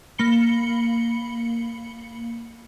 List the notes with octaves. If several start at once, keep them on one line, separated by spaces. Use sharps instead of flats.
A#3 B5 C#7 G7